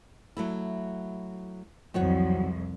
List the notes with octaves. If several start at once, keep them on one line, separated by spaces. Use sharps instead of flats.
F#3 A3 E4
C2 F2 D#3 F#3 C#5 F#5